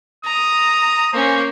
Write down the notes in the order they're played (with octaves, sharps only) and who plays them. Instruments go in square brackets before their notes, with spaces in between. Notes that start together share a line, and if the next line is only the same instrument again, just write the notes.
[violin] A#5 [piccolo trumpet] D#6
[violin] A#3 C#4 [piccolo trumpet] C5